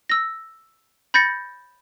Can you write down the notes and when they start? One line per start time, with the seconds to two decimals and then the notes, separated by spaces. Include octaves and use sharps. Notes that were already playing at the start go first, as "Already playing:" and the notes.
0.10 E6 A#6
1.14 B5 G6 A6 A#6 C#7